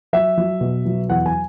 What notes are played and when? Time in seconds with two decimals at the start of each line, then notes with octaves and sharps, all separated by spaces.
0.13 F#3 E5
0.37 F#3
0.61 B2
0.86 F#3
1.09 E2 F#5
1.26 G#5